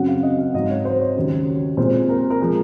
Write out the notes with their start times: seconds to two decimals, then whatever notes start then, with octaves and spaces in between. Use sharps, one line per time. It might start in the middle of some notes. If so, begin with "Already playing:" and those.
Already playing: F#2 C#3 F#3 C4 F#5
0.08 F5
0.23 D#5
0.39 F5
0.54 G#2 F#3 C4 D#5
0.70 C#5
0.85 C5
1.00 C#5
1.15 D#2 C#3 F#3
1.77 A#2 G#3 C4 C5
2.09 A#4
2.30 A#4
2.40 F3 G#3 G#4